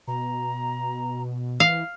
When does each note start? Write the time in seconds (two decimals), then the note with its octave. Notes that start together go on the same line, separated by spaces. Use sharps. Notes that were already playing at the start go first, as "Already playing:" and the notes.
0.07 B2 A#5
1.60 E3 F5